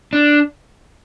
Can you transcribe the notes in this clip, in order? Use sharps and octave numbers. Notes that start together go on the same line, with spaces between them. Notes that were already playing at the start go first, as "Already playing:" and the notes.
D4